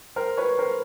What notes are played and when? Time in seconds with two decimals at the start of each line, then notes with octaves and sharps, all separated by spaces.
0.16 A#4 C5
0.37 B4 C#5
0.58 A#4 C5